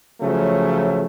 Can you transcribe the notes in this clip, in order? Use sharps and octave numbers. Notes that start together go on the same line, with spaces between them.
C#3 F3 F#3 A3